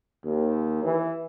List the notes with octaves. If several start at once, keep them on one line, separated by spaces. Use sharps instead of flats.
D#2
E3